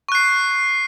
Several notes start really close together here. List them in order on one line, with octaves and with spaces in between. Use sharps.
C#6 F#6 C7